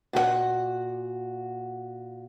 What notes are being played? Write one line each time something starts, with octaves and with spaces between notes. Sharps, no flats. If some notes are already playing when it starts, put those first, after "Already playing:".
A#2 F#4 G#4 F#5